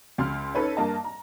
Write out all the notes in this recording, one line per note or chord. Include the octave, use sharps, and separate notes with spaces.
C#2 C6 F6
C#4 D#4 A4 B4 C#5
G2 A#3 A#4 D#5 A5
A#5